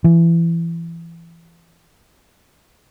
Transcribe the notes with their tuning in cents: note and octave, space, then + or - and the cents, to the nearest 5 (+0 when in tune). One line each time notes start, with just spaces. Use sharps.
E3 +25